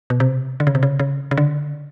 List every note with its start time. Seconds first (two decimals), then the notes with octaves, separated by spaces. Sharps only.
0.10 B2
0.20 C3
0.60 D3
0.67 C#3
0.75 C3
0.83 C#3
0.99 C#3
1.31 C#3
1.37 D3